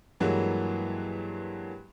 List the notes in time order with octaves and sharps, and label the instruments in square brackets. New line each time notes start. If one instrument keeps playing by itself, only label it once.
[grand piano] G2 E3 F#3 G#3 A#3